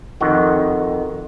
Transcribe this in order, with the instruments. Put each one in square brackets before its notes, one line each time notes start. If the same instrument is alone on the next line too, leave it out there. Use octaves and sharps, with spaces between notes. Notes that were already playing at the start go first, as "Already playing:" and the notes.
[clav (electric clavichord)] F2 D#3 F#4